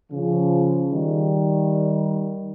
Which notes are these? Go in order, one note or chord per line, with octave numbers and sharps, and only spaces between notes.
C#3 F3
D#3 G3